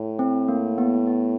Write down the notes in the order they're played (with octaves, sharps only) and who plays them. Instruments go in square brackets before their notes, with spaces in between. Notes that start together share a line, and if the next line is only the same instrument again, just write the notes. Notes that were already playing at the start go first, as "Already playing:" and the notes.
Already playing: [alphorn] A2
[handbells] C4
A#3
B3
B3